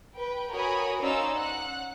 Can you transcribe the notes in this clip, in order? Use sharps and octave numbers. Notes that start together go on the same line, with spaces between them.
B4 G5
F#4 A#4 C#5 G#5 B5 D#6
C#4 D#4 C5 D5 F5 E6
F#5 F#6